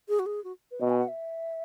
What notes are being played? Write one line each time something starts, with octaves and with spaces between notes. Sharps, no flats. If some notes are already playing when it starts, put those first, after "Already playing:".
G#4
F#4
G#4
F#4
B4
B2 D#5
G#5
F#5
E5